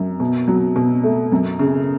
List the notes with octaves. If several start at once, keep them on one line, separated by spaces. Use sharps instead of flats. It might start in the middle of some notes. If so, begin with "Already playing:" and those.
Already playing: F#2
B2
F#3
B2
A3
F#2
C#3